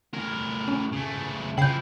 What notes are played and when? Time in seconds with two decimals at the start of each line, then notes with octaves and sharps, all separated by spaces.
0.14 A2 A#4
0.68 C#4
0.92 C#3 A3
1.58 C#3 F3 E4 G5 G6 C7